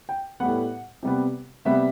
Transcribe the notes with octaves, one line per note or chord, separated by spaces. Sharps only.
G5
A2 G3 B3 F#5
C3 G3 B3
C3 G3 B3 E5